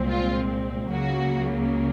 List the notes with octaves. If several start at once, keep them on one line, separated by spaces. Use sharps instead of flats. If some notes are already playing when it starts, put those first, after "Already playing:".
Already playing: C2 A#2 G#3 C4
F4
C#2 C#3 F#3 A#3 F#4